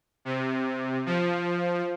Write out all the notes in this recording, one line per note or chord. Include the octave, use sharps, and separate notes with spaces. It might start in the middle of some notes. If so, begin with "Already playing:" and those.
C3
F3